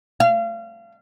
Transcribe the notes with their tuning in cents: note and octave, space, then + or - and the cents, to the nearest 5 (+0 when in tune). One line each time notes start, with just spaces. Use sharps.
F5 -35